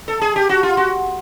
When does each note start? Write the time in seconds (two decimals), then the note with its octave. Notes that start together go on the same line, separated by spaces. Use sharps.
0.08 A4
0.21 G#4
0.36 G4
0.49 F#4
0.63 F4
0.77 F#4